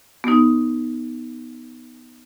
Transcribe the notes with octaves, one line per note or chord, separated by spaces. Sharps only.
B3 D#4